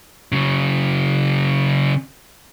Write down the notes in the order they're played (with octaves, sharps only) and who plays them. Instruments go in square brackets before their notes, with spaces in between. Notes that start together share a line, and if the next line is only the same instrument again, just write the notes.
[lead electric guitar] C#3 F#3